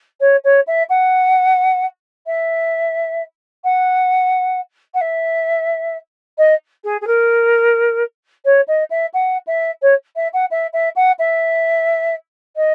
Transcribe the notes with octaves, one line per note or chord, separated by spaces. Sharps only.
C#5
C#5
E5
F#5
E5
F#5
F#5
E5
D#5
G#4
G#4
A#4
C#5
D#5
E5
F#5
E5
C#5
E5
F#5
E5
E5
F#5
E5
D#5